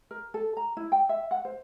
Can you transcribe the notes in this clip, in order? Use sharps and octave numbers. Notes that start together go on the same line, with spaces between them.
A#4
A4
A#5
E4
G5
E5
F#5
C5